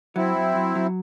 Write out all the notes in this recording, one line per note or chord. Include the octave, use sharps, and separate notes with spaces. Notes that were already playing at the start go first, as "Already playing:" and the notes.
F#3 C4 E4
F#3
F#3
F#3